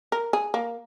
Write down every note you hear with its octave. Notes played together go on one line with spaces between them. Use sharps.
A#4
G#4
A#3